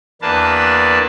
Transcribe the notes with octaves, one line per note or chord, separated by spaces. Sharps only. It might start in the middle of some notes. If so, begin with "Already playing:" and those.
E2 A#3 D4 B4 A5